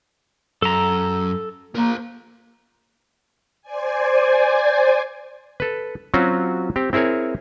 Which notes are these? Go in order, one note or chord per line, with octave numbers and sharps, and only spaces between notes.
F#2 A4 A#5
A#3 A#4 C5
C5 D5 G#5
A4 B4
F#3 C4 C#4 F4 F#4
C4 G4
C4 E4 G#4 A#4 C#5